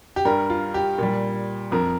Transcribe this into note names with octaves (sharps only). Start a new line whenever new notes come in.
G4
G2 G3 A#4
F4
G4
A#2 G3
F2 F3 A#4